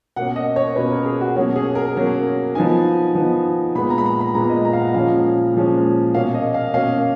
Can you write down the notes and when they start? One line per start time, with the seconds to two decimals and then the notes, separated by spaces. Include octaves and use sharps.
0.16 B2 A#3 C#4 F#5
0.36 D#5
0.56 C#5
0.76 B2 A#3 C#4 B4
0.91 A#4
1.06 G#4
1.21 F#4
1.36 B2 F#3 A#3 C#4 F#4
1.56 G#4
1.75 A#4
1.96 B2 F#3 A#3 C#4
2.55 F3 B3 D#4 G#5
3.15 F3 B3 D#4
3.75 A#2 G#3 B3 B5
3.90 A#5
3.98 B5
4.06 A#5
4.21 B5
4.34 A#2 G#3 B3 A#5
4.50 D#5
4.65 A#5
4.73 F5
4.80 F#5
4.94 A#2 F3 G#3 C#4 F5
5.54 A#2 F3 G#3 C#4
6.14 B2 A#3 C#4 F5
6.35 D#5
6.54 F5
6.74 B2 A#3 C#4 F5